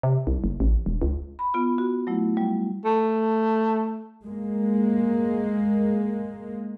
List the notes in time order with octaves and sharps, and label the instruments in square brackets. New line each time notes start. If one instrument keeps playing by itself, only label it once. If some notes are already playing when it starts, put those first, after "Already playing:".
[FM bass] C3
C2
F#1
A1
E1
C#2
[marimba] B5
B3 F4
F#4
F#3 A3 E4
G3
[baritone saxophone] A3
[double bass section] G#3 A#3